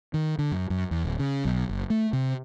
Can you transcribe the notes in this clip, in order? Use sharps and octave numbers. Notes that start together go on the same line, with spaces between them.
D#3
D3
F#2
F#2
E2
D1
C#3
B1
F#1
A3
C3